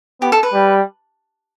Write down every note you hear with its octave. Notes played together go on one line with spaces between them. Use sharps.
B3 G4
A4
B4
G3